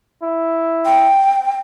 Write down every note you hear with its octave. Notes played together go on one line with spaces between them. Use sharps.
E4
G5